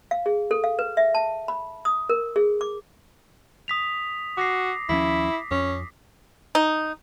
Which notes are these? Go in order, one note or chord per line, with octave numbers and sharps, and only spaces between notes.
F5
G#4
A4
F5
B4
E5
A5
B5
D#6
A#4
G#4
D6
D#6 B6 F7
F#4 D6 A#6 C7
D#2 F3 C#4 E4 B6
F2 C#4
D#4